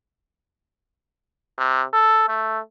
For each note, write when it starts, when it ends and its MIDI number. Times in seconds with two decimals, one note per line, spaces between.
1.58 1.84 48
1.93 2.25 69
2.29 2.60 57